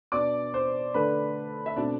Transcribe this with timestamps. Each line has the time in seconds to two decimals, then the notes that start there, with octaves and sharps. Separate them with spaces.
0.12 B2 B3 D4 D5 D6
0.54 C5 C6
0.94 D3 A3 D4 B4 B5
1.66 E5
1.76 B2 A3 C4 D4 D5